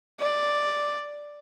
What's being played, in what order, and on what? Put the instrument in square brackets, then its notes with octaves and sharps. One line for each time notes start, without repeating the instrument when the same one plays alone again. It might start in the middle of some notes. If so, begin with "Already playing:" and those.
[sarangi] D5